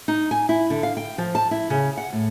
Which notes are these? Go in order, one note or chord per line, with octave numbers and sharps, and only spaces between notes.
D#4
G#5
E4
D3
F5
G5
F3
A5
E4
C#3
F#5
A2